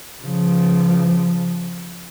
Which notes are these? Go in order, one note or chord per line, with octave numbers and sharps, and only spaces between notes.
C#3 F3